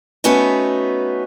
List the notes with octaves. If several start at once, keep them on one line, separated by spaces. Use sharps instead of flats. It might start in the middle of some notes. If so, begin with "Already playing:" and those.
A3 B3 C#4 D#4 F#4 B4